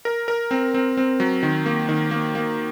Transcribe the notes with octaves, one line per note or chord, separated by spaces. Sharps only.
A#4
A#4
C4
C4
C4
F#3
D#3
A#3
D#3
A#3
A#3